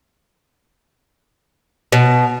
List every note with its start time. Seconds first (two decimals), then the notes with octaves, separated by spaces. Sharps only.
1.92 B2